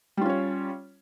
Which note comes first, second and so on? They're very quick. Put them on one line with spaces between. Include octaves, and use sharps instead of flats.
G3 F4 C#4 C#5